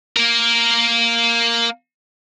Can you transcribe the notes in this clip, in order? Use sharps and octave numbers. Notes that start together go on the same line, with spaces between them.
A#3 A#4